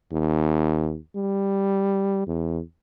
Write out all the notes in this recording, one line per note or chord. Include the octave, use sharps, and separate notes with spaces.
D#2
G3
E2